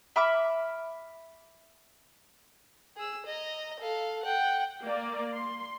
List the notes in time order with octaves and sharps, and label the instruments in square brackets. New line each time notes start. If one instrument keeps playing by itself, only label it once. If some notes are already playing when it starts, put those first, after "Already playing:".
[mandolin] E5 B5 D6 F6
[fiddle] G#4 E6
D#5 A#5
A4 F5
F#5 G5
[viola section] A#3 D5
C6